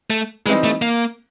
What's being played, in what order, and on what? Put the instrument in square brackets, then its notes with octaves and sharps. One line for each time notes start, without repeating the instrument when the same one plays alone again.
[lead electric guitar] A3
[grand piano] E3 G3 C4 D#4 [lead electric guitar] G#3
[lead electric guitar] A3
A#3